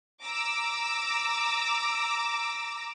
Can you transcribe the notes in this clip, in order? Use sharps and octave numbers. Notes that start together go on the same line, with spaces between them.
A#5 D6 E6